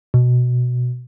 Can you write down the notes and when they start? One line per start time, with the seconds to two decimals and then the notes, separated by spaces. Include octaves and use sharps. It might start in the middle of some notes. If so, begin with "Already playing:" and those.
0.14 B2